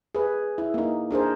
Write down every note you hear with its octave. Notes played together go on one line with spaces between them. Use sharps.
G#4 B4
E4
A#3 D#4
D4 G#4 A#4 C5